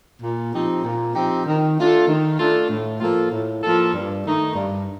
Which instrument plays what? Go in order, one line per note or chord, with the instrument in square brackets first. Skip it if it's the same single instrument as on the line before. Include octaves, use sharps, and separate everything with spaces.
[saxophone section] A#2
F3 C4 D#4 G4
A#2
F3 C4 D#4 G4
D#3
A3 D4 F4 A4
D#3
A3 D4 F4 A4
A2
F3 A#3 F4 A4
A2
F3 A#3 F4 A4
G2
D#3 A3 D#4
G2